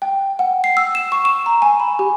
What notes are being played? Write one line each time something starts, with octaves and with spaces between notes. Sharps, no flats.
G5
F#5
C7
E6
E7
C#6
E7
A#5
G#5
B5
G4